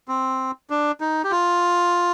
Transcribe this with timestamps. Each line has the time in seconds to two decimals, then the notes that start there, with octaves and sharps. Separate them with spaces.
0.08 C4
0.70 D4
1.01 D#4
1.24 G4
1.31 F4